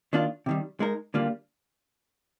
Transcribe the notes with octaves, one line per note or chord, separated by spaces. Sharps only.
D#3 A#3 D4 F4
C3 D#3 G3
G#3 D#4 A#4
D3 G3 A#3 F4